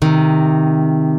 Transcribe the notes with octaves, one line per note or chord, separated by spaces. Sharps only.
C3 D#3